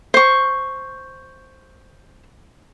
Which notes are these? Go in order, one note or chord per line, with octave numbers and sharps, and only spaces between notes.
C5 C#6